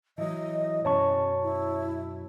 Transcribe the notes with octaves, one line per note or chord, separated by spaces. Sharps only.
E3 F#3 D#5
F#2 B2 F#3 C#4 C#5 A5 C#6
E4